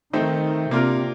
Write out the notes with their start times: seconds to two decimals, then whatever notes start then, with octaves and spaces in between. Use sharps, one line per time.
0.13 D#3 A3 C4 D#4
0.71 C3 A#3 D4 F4 A#4